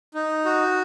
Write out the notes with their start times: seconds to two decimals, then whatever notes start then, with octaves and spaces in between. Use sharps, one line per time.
0.14 D#4
0.45 F#4